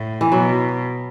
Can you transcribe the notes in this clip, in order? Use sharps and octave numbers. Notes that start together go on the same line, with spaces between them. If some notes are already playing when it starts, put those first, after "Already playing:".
Already playing: A2
E3
B2 F#3